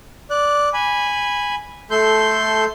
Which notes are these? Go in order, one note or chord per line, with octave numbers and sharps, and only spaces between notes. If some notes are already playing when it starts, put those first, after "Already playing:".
D5 F#6
G#5 B5
A3 A4 C6 G6